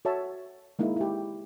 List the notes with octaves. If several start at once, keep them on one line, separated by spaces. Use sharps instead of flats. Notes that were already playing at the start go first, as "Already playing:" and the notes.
F#4 A4 C#5 E5 A5
G#3 A#3 D#4 E4
E4 G4